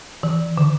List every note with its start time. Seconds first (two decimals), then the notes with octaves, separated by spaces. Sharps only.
0.23 E3
0.58 D3